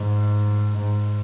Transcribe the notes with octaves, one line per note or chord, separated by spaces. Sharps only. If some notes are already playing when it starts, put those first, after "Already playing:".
Already playing: G#2
G#2